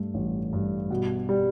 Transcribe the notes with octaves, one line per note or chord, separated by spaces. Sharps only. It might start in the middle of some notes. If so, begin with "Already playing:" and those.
Already playing: G2 A3
A1
G2
B2
G3